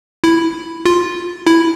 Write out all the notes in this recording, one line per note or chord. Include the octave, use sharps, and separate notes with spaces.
E4
F4
E4